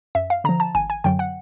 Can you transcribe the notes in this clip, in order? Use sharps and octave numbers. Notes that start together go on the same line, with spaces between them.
F#2 E5
F5
D3 F3 A#5
A5
G#1 G#5
G#5
F#2 D3 F#3 G5
F#5